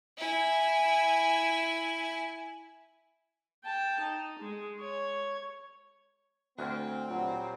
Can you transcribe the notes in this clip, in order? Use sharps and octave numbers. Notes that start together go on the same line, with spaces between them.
E4 G#5
G5 A5
D#4
G#3
C#5
D2 C4 F6 F#6
A#2 F#3 G3 F4 F#5